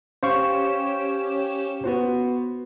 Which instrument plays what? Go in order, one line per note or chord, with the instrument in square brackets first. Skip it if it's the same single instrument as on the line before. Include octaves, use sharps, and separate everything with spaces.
[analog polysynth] C#4 G4 E7 [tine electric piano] C5 F5 C#6
[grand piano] B3 F#4 C5